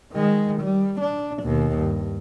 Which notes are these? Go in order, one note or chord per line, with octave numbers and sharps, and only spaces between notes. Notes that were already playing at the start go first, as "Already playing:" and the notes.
D#3 G#3
G3
D4
D#2 B2
G2